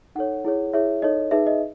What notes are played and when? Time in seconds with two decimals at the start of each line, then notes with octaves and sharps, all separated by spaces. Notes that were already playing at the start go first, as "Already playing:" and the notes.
0.15 D#4 A4 C#5 F#5
0.45 E4 G#4 C#5
0.73 E4 G#4 C#5 E5
1.02 D#4 A4 C#5 D#5
1.31 D#4 G#4 B4 E5
1.47 D#5